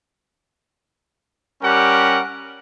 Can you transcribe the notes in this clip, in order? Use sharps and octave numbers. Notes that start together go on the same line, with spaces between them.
G3 C#4 G4 A#4 F#5